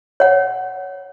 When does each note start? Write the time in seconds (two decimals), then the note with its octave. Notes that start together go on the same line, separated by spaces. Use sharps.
0.20 C#5 F#5